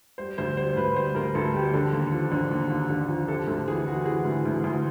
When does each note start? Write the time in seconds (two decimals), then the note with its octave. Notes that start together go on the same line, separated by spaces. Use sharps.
0.18 G3 C5
0.38 D2 C5
0.57 G3 C5
0.76 D2 B4
0.95 G3 C5
1.15 D2 A#4
1.35 D2 A4
1.54 G3 G4
1.74 D3 A4
1.93 D#2
2.12 F3
2.31 D3
2.51 D#2
2.70 D#2
2.90 D3
3.09 F3
3.28 C3 A4
3.47 D2 A4
3.67 E3 G#4
3.86 E3 F#4
4.06 E3 G#4
4.25 D2
4.45 D2
4.64 D2